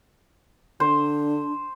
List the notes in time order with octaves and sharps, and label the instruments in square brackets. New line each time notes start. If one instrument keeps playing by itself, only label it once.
[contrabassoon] D3 [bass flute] D4 [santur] C5